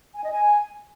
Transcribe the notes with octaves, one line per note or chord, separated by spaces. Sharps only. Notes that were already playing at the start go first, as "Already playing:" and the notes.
G#5
D#5
G#5